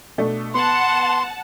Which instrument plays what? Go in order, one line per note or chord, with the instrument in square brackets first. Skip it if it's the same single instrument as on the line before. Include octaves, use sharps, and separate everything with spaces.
[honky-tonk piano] B2 A3 D4
[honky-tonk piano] B3 [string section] F#5 A5 [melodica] C6